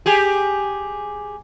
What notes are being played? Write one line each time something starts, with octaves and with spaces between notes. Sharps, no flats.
G4 G#4